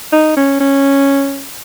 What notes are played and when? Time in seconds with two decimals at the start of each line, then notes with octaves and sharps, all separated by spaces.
0.12 D#4
0.37 C#4
0.60 C#4